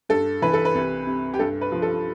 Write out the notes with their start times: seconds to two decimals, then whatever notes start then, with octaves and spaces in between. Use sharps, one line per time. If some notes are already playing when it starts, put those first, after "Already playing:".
0.09 G2 A4
0.42 E3 B4
0.53 A4
0.65 B4
0.75 C2
1.07 C3
1.34 G4
1.39 G2 A4
1.61 B4
1.72 F3
1.82 A4